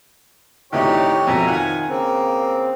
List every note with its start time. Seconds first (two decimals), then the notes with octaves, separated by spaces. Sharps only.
0.73 D2 A2 C3 E3 D#4 G4 C#5 D5
1.27 F2 B2 E5 G#5 A#5
1.47 D#3 F4 F#5 G#5
1.89 C#3 A#3 C4